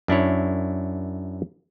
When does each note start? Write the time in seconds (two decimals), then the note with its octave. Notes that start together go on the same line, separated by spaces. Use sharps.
0.08 F#2 D4 E4 C#5